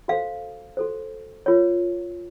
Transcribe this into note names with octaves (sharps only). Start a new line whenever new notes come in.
F#4 A4 C5 F5
F#4 A4 C5
F4 A#4 C#5